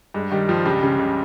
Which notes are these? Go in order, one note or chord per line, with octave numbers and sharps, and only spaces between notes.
G2 G#3
D#3 G3
G2 F3
C#2 G3
C#3
C#2